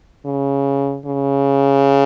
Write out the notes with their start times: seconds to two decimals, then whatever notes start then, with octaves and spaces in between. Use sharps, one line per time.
0.25 C#3
1.06 C#3